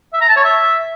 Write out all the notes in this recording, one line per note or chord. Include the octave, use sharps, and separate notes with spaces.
E5
A#5
A5
C#5
E5